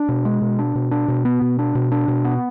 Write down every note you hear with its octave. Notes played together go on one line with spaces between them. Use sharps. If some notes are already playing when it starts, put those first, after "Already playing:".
Already playing: D4
B2
G#3
B2
D4
B2
D4
B2
B3
B2
D4
B2
D4
B2
B3